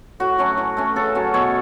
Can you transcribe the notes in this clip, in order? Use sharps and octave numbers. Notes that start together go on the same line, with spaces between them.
A2 F#4
F#3 A3 C#4
E3
A3 C#4
C#3 A4
F#3 C#4
B2 C#5